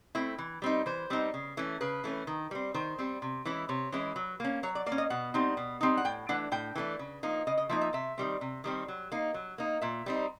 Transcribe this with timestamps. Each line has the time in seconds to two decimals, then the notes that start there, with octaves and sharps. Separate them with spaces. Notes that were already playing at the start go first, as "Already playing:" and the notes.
0.15 A3 C4 E4
0.38 E3
0.62 G3 C4 D#4
0.86 E3 C5
1.10 G3 C4 D#4
1.34 C#3
1.57 E3 A3 C#4
1.81 C#3 B4
2.04 E3 A3 C#4
2.27 D#3
2.51 G3 C4
2.74 D#3 C5
2.99 G3 C4
3.22 C3
3.45 E3 G#3 C#4 E4
3.69 C3 C#5
3.92 E3 G#3 C#4 E4
4.16 F#3
4.40 A#3 C#4
4.63 F#3 C#5
4.75 D5
4.86 A#3 D5
4.92 C#4
4.98 D#5
5.10 B2 F#5
5.34 G3 C4 D#4
5.57 B2
5.81 G3 C4 D#4
5.97 F#5
6.05 A2 G5
6.29 E3 A3 D4 F#5
6.52 A2 G5
6.75 E3 A3 D4
6.99 C#3
7.23 F3 A#3 D#4
7.47 C#3 D#5
7.57 D#5
7.69 F3 A#3 D#4 E5
7.81 E5
7.93 C3 E5
8.18 D#3 G3 C4
8.41 C3
8.64 D#3 G3 C4
8.88 F#3
9.12 A#3 D#4
9.34 F#3
9.58 A#3 D#4
9.81 A#2 E5
10.06 G3 C4 D#4